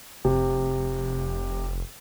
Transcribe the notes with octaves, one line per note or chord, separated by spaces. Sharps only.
F1 C3